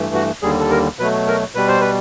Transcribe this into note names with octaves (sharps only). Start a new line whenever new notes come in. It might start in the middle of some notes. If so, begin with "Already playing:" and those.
Already playing: G2 E3 A3
F#4
D#2 D3 G3 G#4
A4
A#4
B2 F#3 A3 B4
A#4
B2 G3 B4
C5
B4